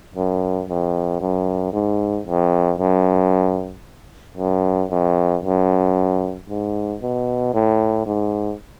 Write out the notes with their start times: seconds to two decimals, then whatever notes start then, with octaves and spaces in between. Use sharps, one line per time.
0.15 F#2
0.68 F2
1.20 F#2
1.73 G#2
2.26 F2
2.79 F#2
4.37 F#2
4.90 F2
5.43 F#2
6.48 G#2
7.01 B2
7.54 A2
8.06 G#2